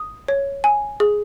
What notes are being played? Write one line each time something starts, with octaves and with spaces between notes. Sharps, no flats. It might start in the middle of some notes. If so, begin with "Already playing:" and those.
Already playing: D#6
C#5
G#5
G#4